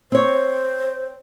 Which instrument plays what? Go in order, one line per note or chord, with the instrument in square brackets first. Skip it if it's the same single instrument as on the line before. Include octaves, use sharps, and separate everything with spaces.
[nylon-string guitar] C4 C#5 [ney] C5